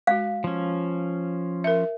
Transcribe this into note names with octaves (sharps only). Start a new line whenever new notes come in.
G#3 F#4 F5
F3 C#4
A#4 E5